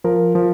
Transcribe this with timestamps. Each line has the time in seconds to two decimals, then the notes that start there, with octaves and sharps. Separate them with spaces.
0.04 F3 A#4
0.35 F3